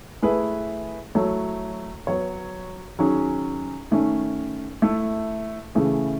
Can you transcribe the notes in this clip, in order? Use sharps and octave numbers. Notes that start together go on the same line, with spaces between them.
A3 E4 G#4 B4
F#3 A3 E4 A4 C#5
F#3 B3 F#4 C#5
D#3 F#3 C#4 G#4
D#3 A3 C#4
A3 E4 A4
C#3 E3 A3 C#4 G#4